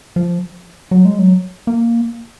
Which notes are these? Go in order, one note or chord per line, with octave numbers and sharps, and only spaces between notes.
F3
F#3
G#3
F#3
A#3